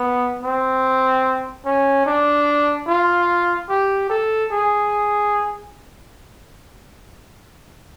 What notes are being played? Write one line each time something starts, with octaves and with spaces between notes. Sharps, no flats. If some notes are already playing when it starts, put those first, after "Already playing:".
Already playing: B3
C4
C#4
D4
F4
G4
A4
G#4